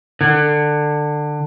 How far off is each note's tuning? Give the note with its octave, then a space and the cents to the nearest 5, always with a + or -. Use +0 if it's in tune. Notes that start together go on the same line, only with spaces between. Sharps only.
D3 +20